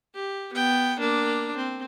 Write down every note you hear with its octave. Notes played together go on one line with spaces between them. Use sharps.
G4
B3 G5
A#3 D4
C4